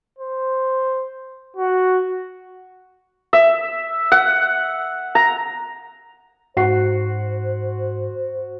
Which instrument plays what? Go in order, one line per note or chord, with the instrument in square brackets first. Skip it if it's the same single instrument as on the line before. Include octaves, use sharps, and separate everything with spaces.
[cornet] C5
F#4
[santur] E5
F#5
A#5
[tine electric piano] G#2 C7 [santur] F#4 [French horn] C5